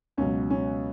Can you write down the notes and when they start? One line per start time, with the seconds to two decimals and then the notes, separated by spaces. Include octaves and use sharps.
0.17 C#2 B2 F#3 C#4
0.50 C#4